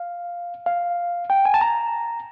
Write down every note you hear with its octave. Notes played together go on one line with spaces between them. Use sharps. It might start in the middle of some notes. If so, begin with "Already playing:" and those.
Already playing: F5
F5
G5
G#5
A5
A#5